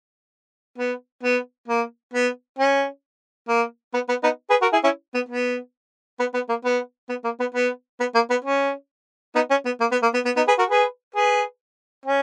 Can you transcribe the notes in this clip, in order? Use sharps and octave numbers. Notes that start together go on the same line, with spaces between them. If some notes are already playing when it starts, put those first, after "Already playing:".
B3
B3
A#3
B3
C#4
A#3
B3
B3
B3 D#4
G#4 B4
F#4 A#4
E4 G#4
C#4 E4
B3
B3
B3
B3
A#3
B3
B3
A#3
B3
B3
B3
A#3
B3
C#4
B3 D#4
C#4
B3
A#3
B3
A#3
B3
B3
B3 D#4
G#4 B4
F#4 A#4
G#4 B4
G#4 B4
C#4